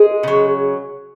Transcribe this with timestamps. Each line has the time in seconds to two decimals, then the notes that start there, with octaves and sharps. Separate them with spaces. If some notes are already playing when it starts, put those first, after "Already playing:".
Already playing: G#3 G#4
0.23 C#3 F#3